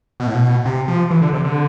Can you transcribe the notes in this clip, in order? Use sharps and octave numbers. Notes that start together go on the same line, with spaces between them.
B2
A2
B2
C3
F3
E3
D3
C3
D3